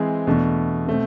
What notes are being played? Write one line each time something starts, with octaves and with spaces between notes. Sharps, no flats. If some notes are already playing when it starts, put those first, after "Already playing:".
Already playing: E3 G#3 C4 G#4
E2 B2 A3 D4
B2 A3 C4